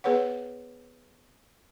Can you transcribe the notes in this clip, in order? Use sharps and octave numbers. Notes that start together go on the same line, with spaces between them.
B3 G#4 B4 C#5 F#5